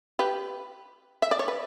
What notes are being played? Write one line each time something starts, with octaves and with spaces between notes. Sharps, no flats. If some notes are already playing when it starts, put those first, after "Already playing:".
G4 B4
E5
D5
C#5
B4